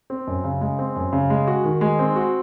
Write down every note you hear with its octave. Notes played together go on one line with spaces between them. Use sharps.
C4
F#2
C#3
G#3
C4
F#2
C#3
G#3
F#4
D#3
G#3
C4
F#4